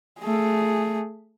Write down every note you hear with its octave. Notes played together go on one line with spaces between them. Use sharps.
A3 G#4